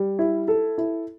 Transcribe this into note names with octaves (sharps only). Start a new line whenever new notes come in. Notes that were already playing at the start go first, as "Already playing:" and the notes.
Already playing: G3
E4
A4
E4